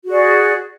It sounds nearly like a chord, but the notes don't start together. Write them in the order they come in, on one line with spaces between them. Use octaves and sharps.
F#4 G#4 D5